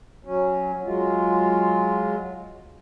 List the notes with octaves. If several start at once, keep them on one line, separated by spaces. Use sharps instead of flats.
F#3 C#4
F#3 G#3 F4